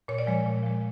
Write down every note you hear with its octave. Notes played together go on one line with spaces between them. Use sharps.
A#2 C#5
D5
F3 G#3 C#5
A#2
F3 G#3